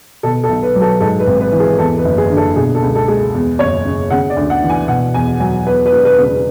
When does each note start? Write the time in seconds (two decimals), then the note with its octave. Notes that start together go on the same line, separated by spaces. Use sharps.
0.23 B2 A4
0.44 A4
0.49 B1
0.62 B4
0.76 F#3
0.81 A4
1.01 G#2 A4
1.20 B4
1.27 G#1
1.40 B4
1.52 E3
1.60 G#4
1.78 E2 A4
1.98 B4
2.04 F#1
2.18 G#4
2.30 D3
2.37 A4
2.56 B2 G#4
2.75 A4
2.82 C#2
2.95 A4
3.08 G#3
3.34 E2
3.59 F#1 C#5
3.85 C#3
4.10 C#3 F#5
4.30 D5
4.36 D2
4.50 F#5
4.62 E3
4.70 G#5
4.88 B2 F#5
5.14 E2 G#5
5.40 F#3 G#5
5.67 E2 B4
5.86 B4
5.92 E1
6.05 B4
6.18 C#3
6.24 B4